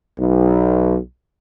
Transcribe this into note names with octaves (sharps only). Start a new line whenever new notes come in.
B1